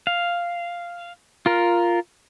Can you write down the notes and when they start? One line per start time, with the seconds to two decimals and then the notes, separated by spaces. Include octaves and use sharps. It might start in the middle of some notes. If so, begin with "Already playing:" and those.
0.07 F5
1.46 F4 A#4